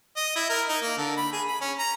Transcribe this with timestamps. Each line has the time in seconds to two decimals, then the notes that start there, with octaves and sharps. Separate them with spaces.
0.17 D#5
0.36 E4
0.49 A#4
0.69 D#4
0.82 A#3
0.97 D3
1.17 B5
1.33 G#4
1.47 B5
1.61 C#4
1.79 A#5